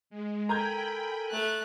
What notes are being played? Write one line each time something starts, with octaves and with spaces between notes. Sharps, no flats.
G#3
A4 A#4 G5 G#5 A#5 B5 G6 G#6
A3 F#6